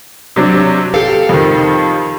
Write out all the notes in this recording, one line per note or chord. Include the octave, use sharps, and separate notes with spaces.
C3 F#3 D4
G4 A4 F5
F2 D#3